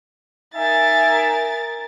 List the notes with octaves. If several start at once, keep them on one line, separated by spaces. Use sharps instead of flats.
D#4 A#4 E5 G#5 A6